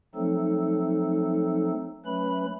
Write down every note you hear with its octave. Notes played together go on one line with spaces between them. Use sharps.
F3 F#3 A3 C4 D#4 A4
F#3 A3 C#4 B4 B5